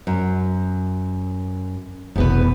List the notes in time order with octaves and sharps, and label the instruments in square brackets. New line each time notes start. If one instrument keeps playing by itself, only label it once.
[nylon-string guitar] F#2
[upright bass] F1 B2 [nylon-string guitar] E2 B3 B4